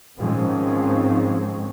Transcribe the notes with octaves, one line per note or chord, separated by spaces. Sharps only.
G#2 D#3 F3 G#3 C4 C#4